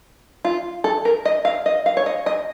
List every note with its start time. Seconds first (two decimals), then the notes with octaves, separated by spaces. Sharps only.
0.45 F4
0.84 A4
1.05 A#4
1.25 D#5
1.45 F5
1.66 D#5
1.86 F5
1.97 C#5
2.06 D#5
2.26 D#5